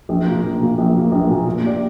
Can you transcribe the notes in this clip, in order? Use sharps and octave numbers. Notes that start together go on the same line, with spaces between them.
A#1
A#2 A#3
A#1
A#2 A#3
A#1
A#2 A#3
A#1
A#2 A#3
A#2
A#3 G4 D5